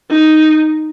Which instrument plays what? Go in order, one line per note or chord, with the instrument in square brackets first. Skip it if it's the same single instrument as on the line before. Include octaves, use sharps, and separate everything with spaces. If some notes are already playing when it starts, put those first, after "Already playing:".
[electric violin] D#4